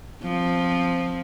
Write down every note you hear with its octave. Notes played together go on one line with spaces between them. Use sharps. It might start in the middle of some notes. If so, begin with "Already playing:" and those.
F3 C4